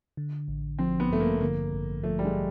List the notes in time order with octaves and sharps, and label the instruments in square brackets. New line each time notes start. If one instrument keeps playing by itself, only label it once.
[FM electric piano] D3
A1
[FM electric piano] F3 [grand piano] C4
[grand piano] B3
[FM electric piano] G2 [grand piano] A3
[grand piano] A#3
[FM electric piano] D3 [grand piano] A#3
[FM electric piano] A1
[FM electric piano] F3 [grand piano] A3
[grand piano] G3
G#3